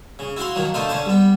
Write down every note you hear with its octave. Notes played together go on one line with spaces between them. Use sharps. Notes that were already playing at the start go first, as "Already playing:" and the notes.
C#3
E4 F#4 F5 C6
D#3 F3 F#3 A#3
D3 A3 D#4 F4 C5
D3 C#4 C5 A5
G3 B3